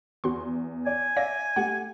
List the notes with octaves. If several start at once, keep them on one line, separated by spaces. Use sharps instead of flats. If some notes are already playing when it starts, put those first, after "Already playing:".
E2 F#4 C6
D5 G#5
D5 E5 F5 A#6
A3 G4 F#5